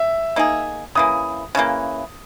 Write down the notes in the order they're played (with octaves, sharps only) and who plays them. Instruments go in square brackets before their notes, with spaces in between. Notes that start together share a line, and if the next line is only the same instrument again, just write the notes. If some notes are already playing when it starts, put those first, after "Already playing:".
Already playing: [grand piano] E5
[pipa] A#3 D#4 G#4
[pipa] C#3 E3 A#3 [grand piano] D#6
[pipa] C#3 E3 A#3